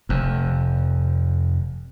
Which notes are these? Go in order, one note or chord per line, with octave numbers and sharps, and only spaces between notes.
F1 F2